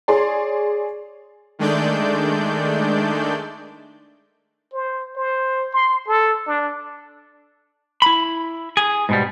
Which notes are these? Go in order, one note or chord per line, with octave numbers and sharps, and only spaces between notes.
G#4 C#5 D5 C6
D#3 G#3 A3 D4 D5 G6
C5
C5
C6
A4
D4
E4 B5
G#4
G#2 B2 G3